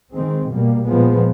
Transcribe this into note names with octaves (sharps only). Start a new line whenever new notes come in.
D#3 G#3 C4
B2 G3 A#3
A#2 F3 G#3 B3